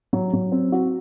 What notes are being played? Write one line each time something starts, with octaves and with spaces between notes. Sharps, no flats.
F#3
F#3
C4
F#4